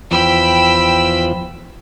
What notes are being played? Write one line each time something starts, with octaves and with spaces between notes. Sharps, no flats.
E2 F3 G5 B5 E6